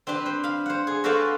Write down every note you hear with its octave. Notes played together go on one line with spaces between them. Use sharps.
C4 D4 G4 B4
C5
F5 B5
C5 F#5
G#4
F#4 A4 B4 C5 D5 F5